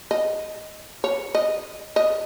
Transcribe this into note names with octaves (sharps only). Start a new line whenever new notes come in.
D#5
C#5
D#5
D#5